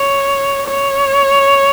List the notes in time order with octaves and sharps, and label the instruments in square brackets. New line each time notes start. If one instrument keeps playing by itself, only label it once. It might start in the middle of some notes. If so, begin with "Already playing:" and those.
Already playing: [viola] C#5
C#5